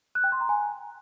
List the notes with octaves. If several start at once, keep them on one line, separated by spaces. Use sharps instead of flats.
F#6
G5
C6
A#5
G#5